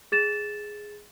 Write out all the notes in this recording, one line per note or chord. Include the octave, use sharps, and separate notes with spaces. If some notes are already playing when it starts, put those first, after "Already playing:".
G#4 A6 E7